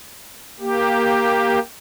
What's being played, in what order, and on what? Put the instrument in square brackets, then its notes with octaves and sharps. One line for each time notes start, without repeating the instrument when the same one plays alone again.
[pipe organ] A#3 G4